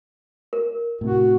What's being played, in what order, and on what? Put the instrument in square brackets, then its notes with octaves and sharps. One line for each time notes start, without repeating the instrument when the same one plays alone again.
[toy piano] A#4
[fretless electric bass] A2 C3 [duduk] F#4